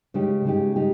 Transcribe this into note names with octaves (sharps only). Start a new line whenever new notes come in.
C#3 G#3 D#4 G4
C#3 G#3 D#4 G4
G#3 D#4 G4